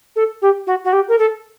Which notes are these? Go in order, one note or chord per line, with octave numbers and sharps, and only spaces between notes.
A4
G4
F#4
F#4
G4
A#4
A4